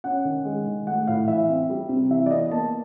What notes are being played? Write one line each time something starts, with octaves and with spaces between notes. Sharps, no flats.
C#4 F#5
D#3
G#3
D#3
A3 F#5
A2 F5
E3 E5
C4
G3
C3
E3 E5
D5
B3 D#5
A#3 A5